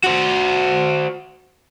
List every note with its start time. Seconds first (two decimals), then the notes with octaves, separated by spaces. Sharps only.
0.04 F#4 C5